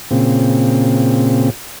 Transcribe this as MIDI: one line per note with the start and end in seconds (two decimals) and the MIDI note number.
0.11 1.50 46
0.11 1.50 49
0.11 1.50 60